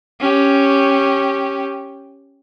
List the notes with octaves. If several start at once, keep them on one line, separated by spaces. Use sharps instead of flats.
C#4 G4